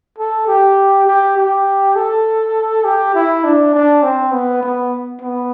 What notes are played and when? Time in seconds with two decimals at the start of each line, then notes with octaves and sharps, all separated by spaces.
0.18 A4
0.48 G4
1.07 G4
1.37 G4
1.96 A4
2.84 G4
3.15 E4
3.44 D4
3.74 D4
4.03 C4
4.32 B3
4.63 B3
5.21 B3